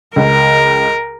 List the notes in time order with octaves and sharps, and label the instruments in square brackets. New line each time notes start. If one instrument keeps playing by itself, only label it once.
[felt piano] C#2 [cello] A#4